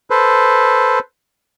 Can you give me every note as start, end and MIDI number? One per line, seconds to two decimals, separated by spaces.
0.10 0.99 69
0.10 0.99 71
0.10 0.99 72